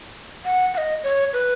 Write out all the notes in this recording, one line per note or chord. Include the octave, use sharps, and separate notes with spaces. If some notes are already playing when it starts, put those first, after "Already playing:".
F#5
F#5
D#5
C#5
B4